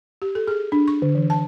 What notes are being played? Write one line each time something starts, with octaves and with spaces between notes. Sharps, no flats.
G4
A4
G#4
D4
C#6
D3
E3
A5